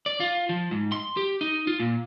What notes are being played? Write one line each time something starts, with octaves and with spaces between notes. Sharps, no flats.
D5
F4
F3
G#2
C6
G4
D#4
F4
A#2